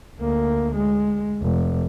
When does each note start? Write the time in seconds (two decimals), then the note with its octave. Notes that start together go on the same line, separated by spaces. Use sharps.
0.20 D2 A#3
0.75 G#3
1.42 F1